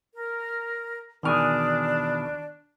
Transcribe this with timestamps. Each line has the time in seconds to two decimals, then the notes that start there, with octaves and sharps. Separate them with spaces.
0.15 A#4
1.23 E2 B2 D#3 D4 G#4 F6